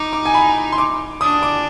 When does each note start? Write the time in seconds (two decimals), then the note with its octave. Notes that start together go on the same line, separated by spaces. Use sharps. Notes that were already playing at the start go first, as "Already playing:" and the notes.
Already playing: D#4 D6
0.13 D6
0.25 G#5
0.34 B5
0.72 C6
0.78 D6
1.21 D4 D#6
1.43 D6